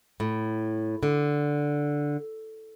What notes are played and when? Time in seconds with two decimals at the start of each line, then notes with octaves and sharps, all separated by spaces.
0.20 A2
1.03 D3